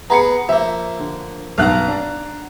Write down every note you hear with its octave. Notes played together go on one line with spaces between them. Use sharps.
B3 G#4 A#5 B5 C#7
F3 A#3 E5
D3
B1 G2 F5 F#5 A#5 F#6
D4